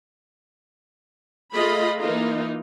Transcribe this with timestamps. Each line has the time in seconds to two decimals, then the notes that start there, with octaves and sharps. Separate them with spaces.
1.53 A3 F4 G#4 D#5 B5
2.00 E3 A#3 D#4 F4